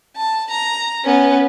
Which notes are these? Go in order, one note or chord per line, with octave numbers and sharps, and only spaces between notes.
A5
A#5
B3 C#4